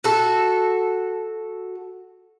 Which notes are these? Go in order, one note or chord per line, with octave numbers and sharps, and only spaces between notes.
F#4 A4